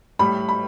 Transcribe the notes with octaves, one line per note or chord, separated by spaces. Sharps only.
A2 G3 B5
B5